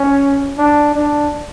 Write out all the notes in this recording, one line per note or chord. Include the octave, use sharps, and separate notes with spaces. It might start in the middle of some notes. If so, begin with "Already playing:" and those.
Already playing: C#4
D4
D4